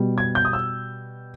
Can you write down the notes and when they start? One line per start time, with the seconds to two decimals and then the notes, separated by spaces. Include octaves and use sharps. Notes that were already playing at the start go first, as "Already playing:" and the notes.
Already playing: B2 G3
0.18 G#6
0.35 G6
0.45 D#6
0.53 E6